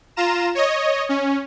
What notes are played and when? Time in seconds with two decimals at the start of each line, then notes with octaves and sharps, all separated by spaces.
0.16 F4 A#5 E7
0.55 C#5 D#5
1.09 C#4